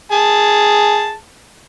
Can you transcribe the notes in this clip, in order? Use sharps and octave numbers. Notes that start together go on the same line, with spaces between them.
G#4 A5